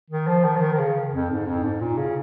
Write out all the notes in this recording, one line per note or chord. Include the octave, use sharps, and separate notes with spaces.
D#3
F3
D#3
F3
D#3
D#3
C#3
F2
G#2
F2
G#2
A#2
C#3